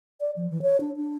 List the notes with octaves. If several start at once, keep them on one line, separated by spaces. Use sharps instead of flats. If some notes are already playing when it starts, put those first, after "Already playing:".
D5
F3
E3
C#5
D4
D4